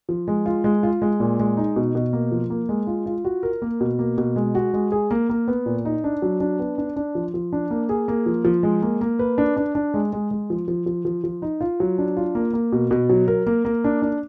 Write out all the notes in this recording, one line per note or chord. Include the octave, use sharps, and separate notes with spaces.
F3
G#3
F4
G#3
F4
G#3
A#2
G#3
D#4
B2
B2
A#3
F3
A#3
G#3
F4
F4
F#4
A#4
A#3
B2
A#3
B2
G#3
F#4
G#3
G#4
A#3
A#3
B3
A#2
D#4
D4
F#3
D4
B3
D4
D4
F3
F3
D4
A#3
G#4
A#3
F3
F3
G#3
A#3
A#3
B4
D4
D4
D4
G#3
G#3
G#3
F3
F3
F3
F3
F3
D#4
F4
F#3
D4
F4
A#3
A#3
B2
B2
F#3
A#4
A#3
A#3
D4
D4